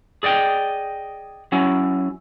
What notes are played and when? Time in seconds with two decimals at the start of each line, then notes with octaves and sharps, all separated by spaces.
0.23 G#4 D5 D#5 G5
1.52 F#3 C#4 E4